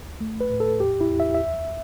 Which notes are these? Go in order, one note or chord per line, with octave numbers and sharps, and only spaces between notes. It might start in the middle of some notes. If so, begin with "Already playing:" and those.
Already playing: D2
A3
B4
A2
A4
E2 G4
E4
E2
E5
D2 E5